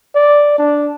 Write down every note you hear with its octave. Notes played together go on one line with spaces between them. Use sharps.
D5
D4